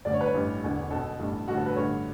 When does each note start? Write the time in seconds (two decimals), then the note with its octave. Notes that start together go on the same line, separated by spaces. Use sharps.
0.05 A1 G2 D3 D5
0.13 C#5
0.21 B4
0.27 C#5
0.33 A1 G2 E3
0.63 E1 E2 D3
0.90 B1 B2 A4
1.19 A1 G2 E3
1.47 A1 G2 D3 F#4
1.57 A4
1.66 B4
1.76 A1 G2 D3 C#5